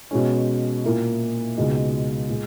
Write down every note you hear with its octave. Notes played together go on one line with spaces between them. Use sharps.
B2 G#3 C#4
A#2 A#3 E4
C#2 B2 G#3 D#4
A#2 G#3